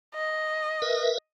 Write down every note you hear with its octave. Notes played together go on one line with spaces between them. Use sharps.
D#5
A#4 B4 E5